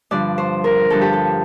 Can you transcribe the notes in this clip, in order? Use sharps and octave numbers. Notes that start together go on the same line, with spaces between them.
G2 D3 F3 D5
C5
A#4
G2 D3 F3 A4
G4
A4